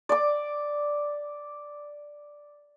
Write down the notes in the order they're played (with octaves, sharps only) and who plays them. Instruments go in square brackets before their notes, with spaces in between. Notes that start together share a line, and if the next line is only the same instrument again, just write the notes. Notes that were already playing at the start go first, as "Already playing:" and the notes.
[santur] D5 D6